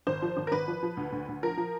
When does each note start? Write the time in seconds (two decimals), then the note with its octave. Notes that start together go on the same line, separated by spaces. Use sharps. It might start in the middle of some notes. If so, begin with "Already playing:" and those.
0.07 G#1 C5
0.22 F3
0.37 G#1
0.47 A#4
0.52 G#1 B4
0.68 F3
0.83 F3
0.97 D2
1.12 D2
1.28 D2
1.43 F3 A#4
1.57 F3